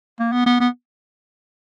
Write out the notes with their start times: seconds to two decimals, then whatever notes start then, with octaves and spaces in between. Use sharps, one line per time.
0.20 A#3
0.32 B3
0.46 B3
0.60 B3